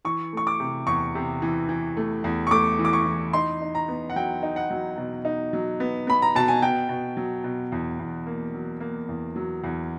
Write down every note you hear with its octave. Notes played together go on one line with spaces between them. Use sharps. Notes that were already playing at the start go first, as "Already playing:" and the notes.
E3 C#6
A3 C#6
D6
C3
E2 C#6
C3
E3
E3
A3
E2
C#6
A3 D6
E3
D6
C#6
E3
D#4 C6
D#4
A#5
B3
F#5
F#3 G5
D#4
F#5
F#3
B2
D#4
F#3
B3
B3 B5
A#5
B2 A5
G#5
B2 G5
B2
F#3
B2
E2
E2
A#3
F#3
A#3
E2
F#3
E2